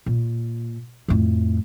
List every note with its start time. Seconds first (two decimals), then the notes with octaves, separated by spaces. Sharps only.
0.06 A#2
1.08 F2 A2